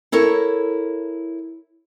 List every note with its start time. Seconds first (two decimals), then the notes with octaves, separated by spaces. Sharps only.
0.12 E4 A4 A#4 C#5